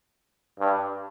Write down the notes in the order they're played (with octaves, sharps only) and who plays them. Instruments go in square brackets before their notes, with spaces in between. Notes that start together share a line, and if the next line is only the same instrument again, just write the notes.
[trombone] G2